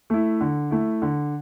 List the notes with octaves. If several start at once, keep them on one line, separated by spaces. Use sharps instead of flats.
A3 E4
D3
A3 E4
D3